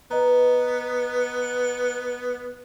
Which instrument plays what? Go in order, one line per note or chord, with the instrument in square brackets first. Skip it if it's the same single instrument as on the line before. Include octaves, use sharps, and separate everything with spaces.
[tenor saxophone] B3 [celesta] B4 D#5 A#5